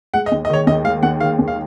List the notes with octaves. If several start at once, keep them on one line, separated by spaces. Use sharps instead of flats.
G#3 F#5
D#5
D#2
D#5
D#3 C#5
D#2 D#5
G#3 F5
D#2 F#5
D#3 F5
D#2
F5